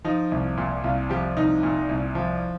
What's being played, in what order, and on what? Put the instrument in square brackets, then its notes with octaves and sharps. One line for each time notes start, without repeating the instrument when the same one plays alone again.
[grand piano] F3 D#4
C2
A#2
C2 F4
F3 G4
C2 D#4
A#2
C2
F3